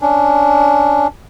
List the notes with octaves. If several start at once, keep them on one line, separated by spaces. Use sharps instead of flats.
C#4 D4